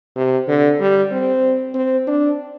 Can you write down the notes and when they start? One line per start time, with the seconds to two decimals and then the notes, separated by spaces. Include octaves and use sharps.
0.16 C3
0.48 D3
0.80 G3
1.12 C4
1.75 C4
2.07 D4